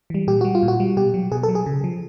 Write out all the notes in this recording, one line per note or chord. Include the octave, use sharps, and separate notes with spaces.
E3 G3
A#2 G4
G3 F#4
F4
A#2
F#4
G3
B2 G4
F#3
B2 G#4
A4
F#3
G#4
C#3
F3